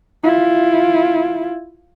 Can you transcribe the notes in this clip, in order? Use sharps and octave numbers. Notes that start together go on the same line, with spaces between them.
E4 F4